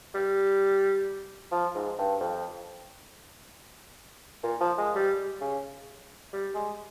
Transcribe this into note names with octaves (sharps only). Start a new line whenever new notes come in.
G3
F3
G#2
G2
F2
A#2
F3
G#3
G3
C#3
G3
G#3